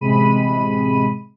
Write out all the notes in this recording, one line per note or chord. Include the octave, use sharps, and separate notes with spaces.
A1 C3 G#3 B5 D#7